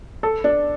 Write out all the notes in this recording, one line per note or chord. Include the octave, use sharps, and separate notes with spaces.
A4
D4